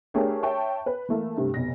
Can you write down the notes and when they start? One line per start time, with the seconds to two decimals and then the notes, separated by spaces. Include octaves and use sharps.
0.14 A3 D4 G4 G#4 A#4 C#5
0.43 C#5 E5 G5 A5 C#6
0.86 B4
1.09 E3 A3 A#3
1.37 G2 C3 A3
1.54 F1 B1 A#6